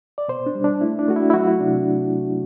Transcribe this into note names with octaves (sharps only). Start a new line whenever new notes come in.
D5
B2 C5
D4
G3
D4
A3 E4
D4
A3 F#4
E4
E4
F#3 F#4
E4
C3 D4